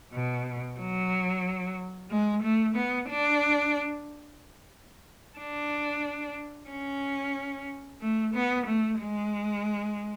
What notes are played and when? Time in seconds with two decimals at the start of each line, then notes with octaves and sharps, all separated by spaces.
0.13 B2
0.79 F#3
2.11 G#3
2.43 A3
2.75 B3
3.09 D4
5.38 D4
6.69 C#4
8.01 A3
8.34 B3
8.66 A3
8.99 G#3